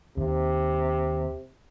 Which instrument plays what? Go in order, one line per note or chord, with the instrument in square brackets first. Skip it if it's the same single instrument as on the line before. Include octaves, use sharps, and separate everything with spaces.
[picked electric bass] D#2 [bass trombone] C3